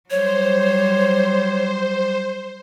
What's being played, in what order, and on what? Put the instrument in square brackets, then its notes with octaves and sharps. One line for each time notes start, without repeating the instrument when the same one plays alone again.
[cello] F#3 G3 [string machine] C5 [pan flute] C#5